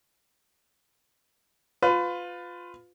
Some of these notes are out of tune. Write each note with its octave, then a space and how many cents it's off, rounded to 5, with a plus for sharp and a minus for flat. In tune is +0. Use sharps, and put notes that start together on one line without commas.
F4 +15 B4 +30